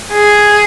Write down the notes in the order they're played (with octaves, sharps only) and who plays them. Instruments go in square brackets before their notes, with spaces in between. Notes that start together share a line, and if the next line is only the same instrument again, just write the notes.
[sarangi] G#4